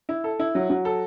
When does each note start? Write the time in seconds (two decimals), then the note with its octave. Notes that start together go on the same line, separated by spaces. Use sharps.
0.09 E4
0.24 A4
0.39 E4
0.55 F#3
0.70 F#3
0.85 A4